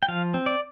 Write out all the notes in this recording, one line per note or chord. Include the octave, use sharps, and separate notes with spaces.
G5
F3 F5
C4
D5